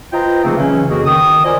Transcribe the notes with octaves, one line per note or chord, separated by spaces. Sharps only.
F4 B4 C5 D#5 G5 A#5
C#3 F3 A3 A#3 C4 D#4
C#3 E3 F#3 C#4
F2 C#3 A#3 F#4 G#4 D#5
D#3 D#6
F4 A#4 C5 D5 D#5 G#5